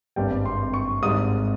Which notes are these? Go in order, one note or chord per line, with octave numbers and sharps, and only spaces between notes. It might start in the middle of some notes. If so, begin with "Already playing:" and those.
G#1 G2 G3 C4 G5
C6
C#6
G#1 G#2 G3 D#6